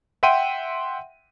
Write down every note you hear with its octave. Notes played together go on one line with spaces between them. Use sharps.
E5 F#5 G5 C6 D#7